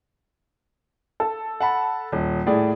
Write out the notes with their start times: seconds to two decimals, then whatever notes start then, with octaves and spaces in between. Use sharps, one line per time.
1.20 A4
1.60 F#5 A5 B5
2.12 D#1
2.47 A2 G#4 D5